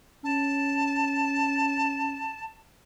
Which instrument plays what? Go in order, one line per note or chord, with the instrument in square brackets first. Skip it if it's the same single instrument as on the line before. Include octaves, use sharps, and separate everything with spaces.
[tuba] C#4 [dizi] A5